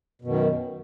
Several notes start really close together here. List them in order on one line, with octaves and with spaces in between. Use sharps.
B2 F#2 D#3